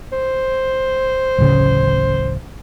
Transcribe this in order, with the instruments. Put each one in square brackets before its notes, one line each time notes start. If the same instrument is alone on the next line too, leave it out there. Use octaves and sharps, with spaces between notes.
[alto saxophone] C5
[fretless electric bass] D1 A1 C#3